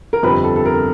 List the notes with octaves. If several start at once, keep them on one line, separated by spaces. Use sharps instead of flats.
A#4
G1 F2 C3 B4
A4
A4
A#4